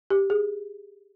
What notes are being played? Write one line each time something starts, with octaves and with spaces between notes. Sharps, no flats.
G4
G#4